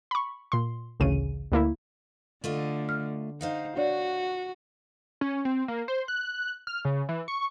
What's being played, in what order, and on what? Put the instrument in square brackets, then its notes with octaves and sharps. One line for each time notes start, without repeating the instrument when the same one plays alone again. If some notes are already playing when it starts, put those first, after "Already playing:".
[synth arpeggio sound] B5 C#6
A#2 C6
A1 D2 C#3 D#7
D2 A#3 E4
[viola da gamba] D3 [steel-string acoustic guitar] A3 F4 D#5
[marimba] F6
[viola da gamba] D#4 [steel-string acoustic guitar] C5 F5 F#5
[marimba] D4 C#5 D5 [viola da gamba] F#4
[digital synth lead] C#4
C4
A#3
C5
F#6
F6
C#3
E3
C#6